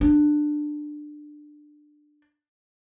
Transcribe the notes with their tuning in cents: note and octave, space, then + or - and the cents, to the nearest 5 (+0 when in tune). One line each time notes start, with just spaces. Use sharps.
D4 +20